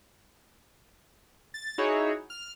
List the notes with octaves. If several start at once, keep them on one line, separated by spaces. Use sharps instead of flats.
A6
D#4 E4 F#4 G#4 C#5
F6